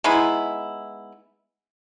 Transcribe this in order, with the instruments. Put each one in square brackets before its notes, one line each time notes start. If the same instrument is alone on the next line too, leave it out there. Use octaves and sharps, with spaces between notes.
[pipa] G#3 B3 D#4 E4